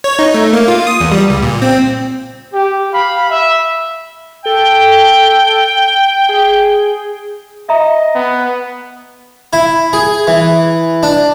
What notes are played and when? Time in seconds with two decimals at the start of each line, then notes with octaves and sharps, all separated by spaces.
0.04 C#5
0.19 D#4
0.34 A3
0.53 A#3
0.68 F4
0.87 D#6
1.00 E2
1.12 G3
1.30 C#2
1.42 A#2
1.62 C4
2.53 G4
2.92 F5 B5
3.29 E5
4.46 A4 G5 G7
6.29 G#4
7.69 D#5 E5 A#5
8.15 B3
9.53 E4
9.93 G#4
10.27 E3
11.03 D4